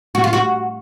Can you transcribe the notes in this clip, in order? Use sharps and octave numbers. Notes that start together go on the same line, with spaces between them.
F#4
F4
F#4